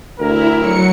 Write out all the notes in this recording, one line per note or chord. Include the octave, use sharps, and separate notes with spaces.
D2 E4 A#4
F#3 C#7